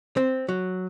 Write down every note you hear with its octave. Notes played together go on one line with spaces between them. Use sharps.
C4
F#3